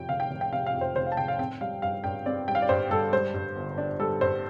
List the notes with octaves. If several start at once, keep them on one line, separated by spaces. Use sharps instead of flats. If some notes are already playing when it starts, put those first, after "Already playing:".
Already playing: F2 C3 G5
F1 F5
G5
F1
G5
C3 F5
F5
F2
C5
F1 C5
F5
A5
F1 G5
F5
C4 G5
G3 F5
G2 F5
G2 G5
C4 D5
G3 G5
F5
D5
G2 C5
G2 A4
G3 C5
G2
G1
D4
G3 A4
G2 C5